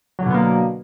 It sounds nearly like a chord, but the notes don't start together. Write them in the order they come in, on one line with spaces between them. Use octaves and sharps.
F#3 D3 B2 B3 A#3